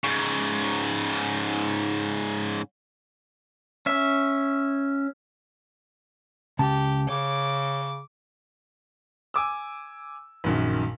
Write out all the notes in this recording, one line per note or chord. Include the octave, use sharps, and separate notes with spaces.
G#2 C#3
C#4 E5
C#2 C#3 G4 A5
C#3 C#5 D6
G#5 D6 E6
A#1 F#2 D#3